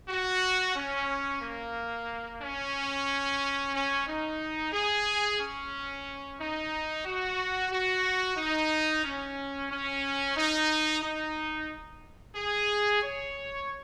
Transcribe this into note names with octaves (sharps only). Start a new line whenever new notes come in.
F#4
C#4
A#3
C#4
C#4
D#4
G#4
C#4
D#4
F#4
F#4
D#4
C#4
C#4
D#4
D#4
G#4
C#5